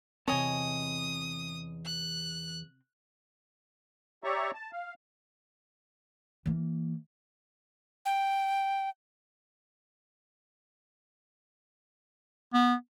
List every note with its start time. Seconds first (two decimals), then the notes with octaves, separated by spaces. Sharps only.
0.28 E2 C3 C4 C#5 D#5 G#5 A5 D#6
1.85 F#6
4.24 G4 C#5 D5 E5 A#5 C#6
4.54 A5
4.73 F5
6.46 E3 A#3
8.06 G5
12.54 B3